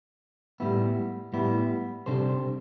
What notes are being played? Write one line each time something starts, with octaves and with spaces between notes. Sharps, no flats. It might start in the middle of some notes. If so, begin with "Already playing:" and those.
A2 G3 B3 E4
A2 G3 B3 E4
C3 G3 D4 A4 C5